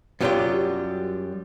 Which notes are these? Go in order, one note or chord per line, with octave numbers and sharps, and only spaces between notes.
F#2 F#3 G3 B3 F4 G4